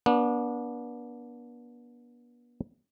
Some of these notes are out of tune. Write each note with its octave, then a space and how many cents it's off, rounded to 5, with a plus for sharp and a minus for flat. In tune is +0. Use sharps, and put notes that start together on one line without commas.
B3 -40 D4 -20